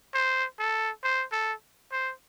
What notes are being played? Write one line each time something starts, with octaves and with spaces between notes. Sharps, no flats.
C5
A4
C5
A4
C5